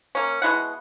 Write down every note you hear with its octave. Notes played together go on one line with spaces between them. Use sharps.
A#3 C#4
B2 G#3 E4 F#5